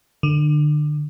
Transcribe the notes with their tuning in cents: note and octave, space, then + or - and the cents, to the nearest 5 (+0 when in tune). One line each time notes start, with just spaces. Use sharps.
D3 +30